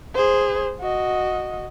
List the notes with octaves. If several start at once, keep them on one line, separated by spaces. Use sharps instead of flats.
G#4 C5
F#4 D#5